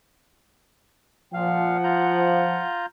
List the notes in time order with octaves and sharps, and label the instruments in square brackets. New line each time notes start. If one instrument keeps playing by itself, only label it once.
[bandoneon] A#2 F5 [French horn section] F3 [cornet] F#5
[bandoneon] F4 A#5 G6